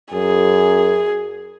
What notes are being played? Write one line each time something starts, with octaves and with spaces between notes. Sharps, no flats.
F#2 G#4